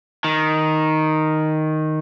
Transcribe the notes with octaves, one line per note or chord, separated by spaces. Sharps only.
D#3